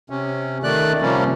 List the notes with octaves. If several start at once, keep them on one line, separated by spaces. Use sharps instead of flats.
C3 C#4
D#3 A3 D5 F#6
C3 F3 G3 A#3 C#4